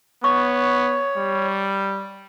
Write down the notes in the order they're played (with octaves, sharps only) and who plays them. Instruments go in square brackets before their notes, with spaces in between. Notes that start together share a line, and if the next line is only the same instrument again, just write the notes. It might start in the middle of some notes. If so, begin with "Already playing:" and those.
[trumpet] B3 [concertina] C#5 [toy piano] C#6
[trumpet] G3